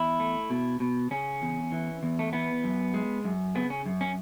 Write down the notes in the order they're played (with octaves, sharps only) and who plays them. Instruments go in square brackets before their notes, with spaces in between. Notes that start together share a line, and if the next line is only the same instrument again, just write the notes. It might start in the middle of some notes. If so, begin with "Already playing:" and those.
Already playing: [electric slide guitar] E2 E4
A3
B2
B2
C#3 C#4
E2
E3
E2
A3
E3 B3
F#2
G#3
F#2
C#3 B3
C#4
F#2
C#4